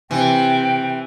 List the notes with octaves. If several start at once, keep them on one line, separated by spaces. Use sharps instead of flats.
C3 E3 G5